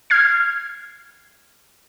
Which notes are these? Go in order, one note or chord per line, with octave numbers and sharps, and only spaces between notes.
F6 G#6 C7